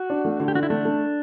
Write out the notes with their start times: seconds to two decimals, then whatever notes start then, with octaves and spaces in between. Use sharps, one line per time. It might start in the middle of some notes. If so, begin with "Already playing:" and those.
Already playing: F#4
0.10 D4
0.25 A3
0.40 D3
0.48 G4
0.54 D3 F#4
0.63 E4
0.70 A3 D4
0.85 A3